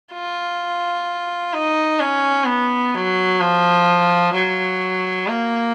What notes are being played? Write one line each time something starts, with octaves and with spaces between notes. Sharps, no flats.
F4
D#4
C#4
B3
F#3
F3
F#3
A#3